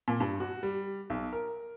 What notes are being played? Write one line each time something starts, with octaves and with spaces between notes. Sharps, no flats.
A#2
G2
F#4
G3
B1
A#4